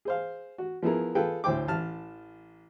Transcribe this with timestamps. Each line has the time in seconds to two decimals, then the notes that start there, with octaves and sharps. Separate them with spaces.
0.05 G#4 C5 F5
0.58 F#4
0.83 F3 B3 E4 G#4 A#4
1.15 F4 G#4 A4 B4 G5
1.44 D2 A2 C5 G5 D6
1.68 A1 A5 F6